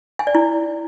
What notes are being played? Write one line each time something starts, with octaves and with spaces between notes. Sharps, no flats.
G#5
D5
E4